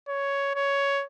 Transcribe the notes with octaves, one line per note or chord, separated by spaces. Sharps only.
C#5
C#5